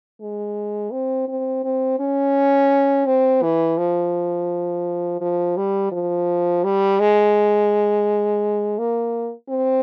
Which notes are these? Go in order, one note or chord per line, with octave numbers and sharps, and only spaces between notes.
G#3
C4
C4
C4
C#4
C4
E3
F3
F3
G3
F3
G3
G#3
A#3
C4